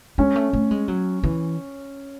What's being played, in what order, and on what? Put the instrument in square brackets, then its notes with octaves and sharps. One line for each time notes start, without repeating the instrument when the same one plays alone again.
[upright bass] G#3 [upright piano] C#4
[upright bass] A3
A3
G#3
F#3
E3